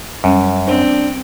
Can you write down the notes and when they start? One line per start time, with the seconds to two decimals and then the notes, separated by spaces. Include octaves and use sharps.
0.24 F#2 G3 C#4
0.67 C4 D4 C5